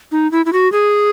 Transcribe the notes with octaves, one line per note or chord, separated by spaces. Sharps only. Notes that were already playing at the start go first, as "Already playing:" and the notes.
D#4
E4
E4
F#4
G#4